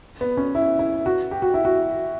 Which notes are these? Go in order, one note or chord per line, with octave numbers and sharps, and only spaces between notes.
B3
C#4
E4
E4
F#4
G4
F#4
E4
F#4